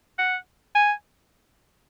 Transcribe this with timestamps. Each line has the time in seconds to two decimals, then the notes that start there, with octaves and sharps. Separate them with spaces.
0.19 F#5
0.75 G#5